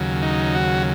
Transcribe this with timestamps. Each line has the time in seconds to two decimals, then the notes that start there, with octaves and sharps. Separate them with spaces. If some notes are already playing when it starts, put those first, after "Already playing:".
Already playing: D#2 C#3 F#3
0.22 D#4
0.55 F#4